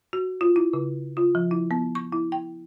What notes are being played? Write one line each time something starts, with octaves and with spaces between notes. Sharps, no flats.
F#4
F4
E4
C#3
F4
F3
E4
B3
C#6
E4
G5